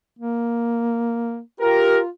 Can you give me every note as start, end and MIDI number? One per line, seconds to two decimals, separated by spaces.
0.19 1.40 58
1.60 2.09 65
1.60 1.99 67
1.60 1.99 70